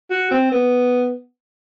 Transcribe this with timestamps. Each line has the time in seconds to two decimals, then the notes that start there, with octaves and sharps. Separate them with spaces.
0.10 F#4
0.31 C4
0.52 B3